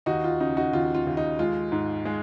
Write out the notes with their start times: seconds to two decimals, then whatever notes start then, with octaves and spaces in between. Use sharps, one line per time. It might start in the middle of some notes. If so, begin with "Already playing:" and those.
0.06 D#2 D#4 F#4
0.24 F4
0.40 C#3 D#4
0.57 D#4 F#4
0.73 D#2 F4
0.95 F4
1.07 D#2
1.17 D#4
1.39 G#3 F4
1.72 G#2
2.05 G#3